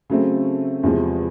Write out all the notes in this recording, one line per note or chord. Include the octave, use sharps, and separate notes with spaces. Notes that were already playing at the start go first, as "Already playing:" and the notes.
C#3 F#3 A3 C4
E2 C3 F3 G#3